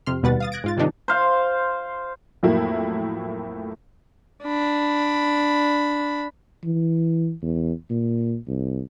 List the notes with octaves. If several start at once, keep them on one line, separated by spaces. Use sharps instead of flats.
F2 C3 C6 F6
D#2 B2 G3 B4 F#5 A6
F5 D#6 A6
F#6 G#6 A#6 D7
G#2 F4 A6
G2 C3 D#3 D4 D#4
C5 F5
F2 A2 F#3 A3 A#3 E4
D4 B5
E3
E2
A#2
C2